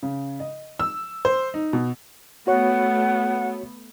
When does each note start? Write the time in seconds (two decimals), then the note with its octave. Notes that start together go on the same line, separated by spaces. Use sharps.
0.03 C#3
0.40 D#5
0.79 E6
1.25 C5
1.54 D#4
1.73 B2
2.47 A3 B3 F#4 C#5 F#5